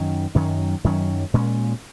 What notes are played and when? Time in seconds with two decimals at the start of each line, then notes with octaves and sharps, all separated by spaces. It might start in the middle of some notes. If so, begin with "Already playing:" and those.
Already playing: F#2 D#3 F#3 C#4
0.35 F#2 D#3 F#3 C#4
0.84 F#2 D#3 F#3 C#4
1.34 A#2 G#3 C#4